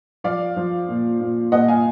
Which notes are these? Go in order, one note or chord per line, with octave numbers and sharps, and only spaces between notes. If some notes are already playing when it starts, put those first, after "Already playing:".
F3 D5 F5
F3
A#2
A#2
A#2 D#5 F#5
F5 G#5